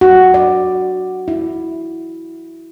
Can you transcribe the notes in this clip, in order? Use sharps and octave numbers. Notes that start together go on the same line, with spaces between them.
F#4
D5
E4